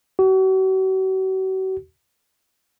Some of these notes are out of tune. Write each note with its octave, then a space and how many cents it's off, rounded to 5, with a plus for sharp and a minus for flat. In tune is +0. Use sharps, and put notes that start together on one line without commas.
F#4 +40